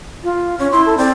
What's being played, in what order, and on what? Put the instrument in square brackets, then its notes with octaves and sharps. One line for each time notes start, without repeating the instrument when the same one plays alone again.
[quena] F4
[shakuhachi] C#4 [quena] C#5
[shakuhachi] E4 [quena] C6
[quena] A4
[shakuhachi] C4 [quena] D5